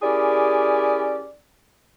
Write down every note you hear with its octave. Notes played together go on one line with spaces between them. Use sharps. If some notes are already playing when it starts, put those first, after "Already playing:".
C#4 E4 G4 G#4 A#4 D5